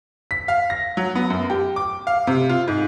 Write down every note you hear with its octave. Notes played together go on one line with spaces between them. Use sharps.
B6
F5
A#6
F#3
B3
F#2
G4
D6
F5
C3
F4
G#2